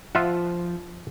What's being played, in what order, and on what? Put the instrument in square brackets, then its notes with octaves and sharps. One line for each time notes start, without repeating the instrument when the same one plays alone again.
[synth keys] F3 [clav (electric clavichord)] F4 E5 F#5